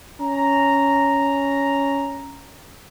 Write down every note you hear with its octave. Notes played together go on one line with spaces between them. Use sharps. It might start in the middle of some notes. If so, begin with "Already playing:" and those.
C#4 A#5